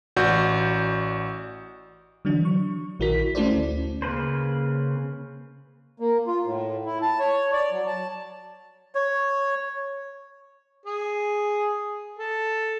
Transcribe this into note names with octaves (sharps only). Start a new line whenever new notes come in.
A1 F#4 D5 G6
D3 E3 F#3 D4
C#6
A#1 D#3 E4 F#4 A#4 B6
A3 C#4 E4 A4 C5 D5
D2
C#3 A#3 B4 C5
A#3
F4
A2
E4
A5
C#5
D5
F#3
A5
C#5
G#4
A4